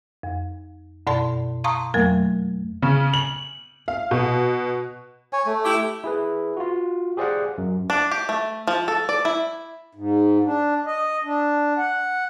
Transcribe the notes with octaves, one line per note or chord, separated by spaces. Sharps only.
F2
F#2 B2 D5 A5 C6
F5 A5 A#5 C6 C#6 D#6
F2 F#3 A3 A#3 A#4
C#3
F#7
F5
B2
C#5 G#5
A3
E4 G4
E4 G#4 B4
F4 F#4
G4 G#4 C5 D5 F5 F#5
F#2
D4
G4
A3
F3
A4
D5
E4
G#2
D4
D#5
D4
F#5